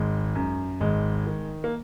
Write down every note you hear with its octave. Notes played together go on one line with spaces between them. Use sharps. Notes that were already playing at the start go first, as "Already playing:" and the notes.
Already playing: G#1 G#3
F#2
G#1 G#3
D#3
A#3